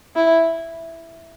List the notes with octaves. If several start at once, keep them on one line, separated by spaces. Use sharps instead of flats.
E4